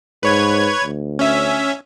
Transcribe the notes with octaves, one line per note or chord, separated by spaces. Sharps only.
G#2 B4 C#5 G#6
D2
C#4 E5